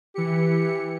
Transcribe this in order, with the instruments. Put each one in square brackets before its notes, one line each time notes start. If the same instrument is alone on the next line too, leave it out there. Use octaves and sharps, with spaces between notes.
[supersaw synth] E3 C#7 [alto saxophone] G4